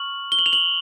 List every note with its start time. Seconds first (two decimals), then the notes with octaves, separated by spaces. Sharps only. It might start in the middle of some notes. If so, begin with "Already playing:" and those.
Already playing: C#6 F6 F#7
0.32 G7
0.39 F#7
0.46 F7
0.53 F#7